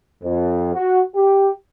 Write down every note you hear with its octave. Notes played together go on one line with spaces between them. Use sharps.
F2
F#4
G4